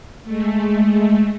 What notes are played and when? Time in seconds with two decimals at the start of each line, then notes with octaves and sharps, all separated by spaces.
0.23 G#3 A3